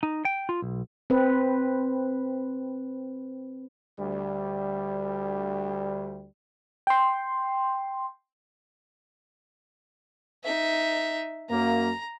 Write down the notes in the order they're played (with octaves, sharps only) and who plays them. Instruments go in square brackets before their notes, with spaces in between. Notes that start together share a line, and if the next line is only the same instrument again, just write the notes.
[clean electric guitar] D#4
G5
F4
B1
[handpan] C4 B4
[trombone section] D2 G3
[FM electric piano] G5 C6
[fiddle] D#4 E5
[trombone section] F#2 A#3 [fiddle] A#5